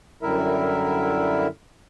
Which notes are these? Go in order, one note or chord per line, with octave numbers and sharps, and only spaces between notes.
F#2 D3 G3 E4 A#4 E5